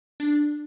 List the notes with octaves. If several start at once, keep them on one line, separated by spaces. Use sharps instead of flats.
D4